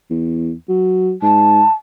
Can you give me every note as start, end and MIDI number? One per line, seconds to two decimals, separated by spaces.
0.10 0.52 40
0.69 1.13 54
1.22 1.63 44
1.22 1.72 81